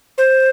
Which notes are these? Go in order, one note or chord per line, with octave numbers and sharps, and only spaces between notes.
C5